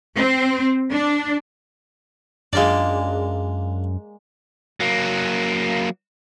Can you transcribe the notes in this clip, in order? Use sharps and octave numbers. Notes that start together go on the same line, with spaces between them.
C4
D4
F#2 G#3 A#3 D4 F4 D5
F#3 A#3